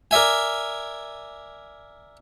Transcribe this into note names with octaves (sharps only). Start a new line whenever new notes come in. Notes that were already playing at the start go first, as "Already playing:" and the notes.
A#4 D5 E5 G#5